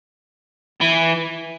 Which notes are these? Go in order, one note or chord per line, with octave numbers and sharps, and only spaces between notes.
E3